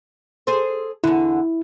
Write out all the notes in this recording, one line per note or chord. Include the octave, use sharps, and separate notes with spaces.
G#4 A4 C5
E2 D3 E4